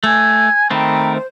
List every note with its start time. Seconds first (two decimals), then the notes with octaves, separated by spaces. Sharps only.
0.04 A3 G#5 G#6
0.71 D#3 A3 C4 G5 A#5 B5
1.14 C5